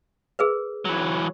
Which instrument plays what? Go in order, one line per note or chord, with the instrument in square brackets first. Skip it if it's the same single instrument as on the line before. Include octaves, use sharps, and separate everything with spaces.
[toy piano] G#4 A#4 B4
[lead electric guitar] E3 F#3